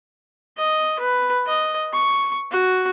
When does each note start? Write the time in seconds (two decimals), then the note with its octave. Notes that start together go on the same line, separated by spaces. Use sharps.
0.57 D#5
0.99 B4
1.47 D#5
1.93 C#6
2.52 F#4